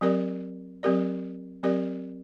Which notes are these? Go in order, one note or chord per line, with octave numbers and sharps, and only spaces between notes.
F#3 C4 G4 A#4 D5
F#3 C4 G4 A#4 D5
F#3 C4 G4 A#4 D5